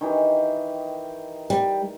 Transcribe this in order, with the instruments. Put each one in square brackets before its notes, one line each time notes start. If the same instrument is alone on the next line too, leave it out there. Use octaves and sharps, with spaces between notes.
[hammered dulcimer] D#3 E3 G4
[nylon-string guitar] G3